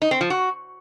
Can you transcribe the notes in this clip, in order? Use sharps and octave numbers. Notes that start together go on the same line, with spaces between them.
D#4
C4
F3
F#4